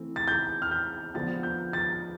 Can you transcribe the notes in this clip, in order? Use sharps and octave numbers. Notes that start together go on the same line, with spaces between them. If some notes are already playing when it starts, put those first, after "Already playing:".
Already playing: E3 A3 C4
A6
G6
F6
G6
D3 F3 B3 A6
G6
A6